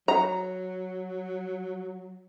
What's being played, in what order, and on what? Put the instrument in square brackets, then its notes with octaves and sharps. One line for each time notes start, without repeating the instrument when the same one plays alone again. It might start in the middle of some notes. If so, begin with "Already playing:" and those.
[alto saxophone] F#3 [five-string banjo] A#5